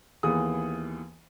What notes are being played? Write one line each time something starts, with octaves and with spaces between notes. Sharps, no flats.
D#2 E3 B3 G#4 D#6